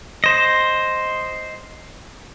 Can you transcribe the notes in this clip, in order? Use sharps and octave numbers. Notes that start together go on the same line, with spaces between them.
C5 D#5